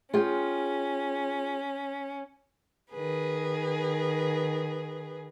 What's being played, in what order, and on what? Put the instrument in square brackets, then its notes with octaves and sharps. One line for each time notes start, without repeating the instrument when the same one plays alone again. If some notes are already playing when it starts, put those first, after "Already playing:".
[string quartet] C#4 [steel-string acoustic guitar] F4 G#4 G5
[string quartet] D#3 G#4 B4